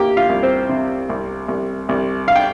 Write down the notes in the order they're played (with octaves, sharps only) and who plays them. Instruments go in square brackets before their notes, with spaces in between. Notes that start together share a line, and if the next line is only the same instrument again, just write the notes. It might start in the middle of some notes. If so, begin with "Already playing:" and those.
Already playing: [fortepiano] A#3 G4 G5
F4 F5
C2
C4 C5
C3
C2
C2
C2
F5
G5